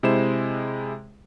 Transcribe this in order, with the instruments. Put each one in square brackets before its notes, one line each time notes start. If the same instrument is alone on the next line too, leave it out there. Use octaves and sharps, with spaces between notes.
[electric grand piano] C3 G#3 E4 C5 E7